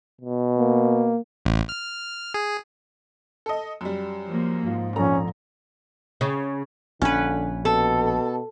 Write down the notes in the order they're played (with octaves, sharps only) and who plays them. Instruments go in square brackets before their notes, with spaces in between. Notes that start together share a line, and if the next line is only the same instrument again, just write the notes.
[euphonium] B2
[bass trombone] A#3
[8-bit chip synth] A1
F6
G#4
[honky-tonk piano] A4 D#5
F#2 G3
[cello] F3 A#3
[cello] G#2 [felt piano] F3
[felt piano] A#1 F2 A4 [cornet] C#4 [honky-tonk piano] A#5
[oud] C#3
[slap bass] A#1 [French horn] D3 [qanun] C#4 B4
[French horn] B2 [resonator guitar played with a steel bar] A4